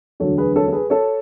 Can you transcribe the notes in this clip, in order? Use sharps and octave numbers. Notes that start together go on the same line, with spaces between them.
E1 D2 D3 F#3 A4 C#5
G#4 B4
A4 C#5
A4
G#4 B4
A4 C#5